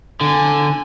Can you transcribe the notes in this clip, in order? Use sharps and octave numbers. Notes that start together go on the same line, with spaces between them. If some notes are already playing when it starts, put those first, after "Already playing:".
D3 G#5